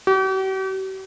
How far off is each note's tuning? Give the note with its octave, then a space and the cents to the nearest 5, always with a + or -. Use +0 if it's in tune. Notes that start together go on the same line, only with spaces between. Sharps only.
G4 -45